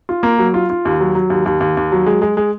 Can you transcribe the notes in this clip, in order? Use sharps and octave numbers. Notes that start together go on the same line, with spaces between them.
F4
A#3
F#3
F4
F4
D#2
F#3
F#3
D#2
D#2
D#2
D#2
F#3
G#3
G#3
G#3